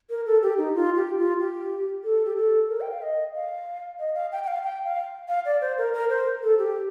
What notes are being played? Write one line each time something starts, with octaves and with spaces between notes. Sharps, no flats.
A#4
A4
G4
D#4
F4
G4
F4
G4
A4
G4
A4
A#4
G5
F5
D#5
F5
D#5
F5
G5
G5
F5
G5
F5
F5
D5
C5
A#4
A#4
C5
A4
G4